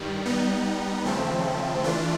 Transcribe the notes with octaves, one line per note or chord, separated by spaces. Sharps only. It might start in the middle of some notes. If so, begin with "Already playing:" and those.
Already playing: G2 D#3 G3
G3 B3 D#4
D#2 C#3 F3 A3 C4
E3 A3 D4 F4